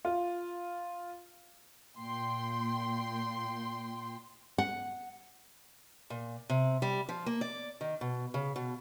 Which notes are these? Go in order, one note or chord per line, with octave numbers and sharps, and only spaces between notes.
F4
A#2 G5 C6
F#5
A#2
C3
G3
F3
A#3
D5
D#3
B2
C#3
B2